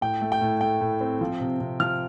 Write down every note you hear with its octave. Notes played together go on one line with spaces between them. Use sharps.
A2 G5
A3
G5
A2
A3 G5
A2
C4
F3
C3
C3
F3 F6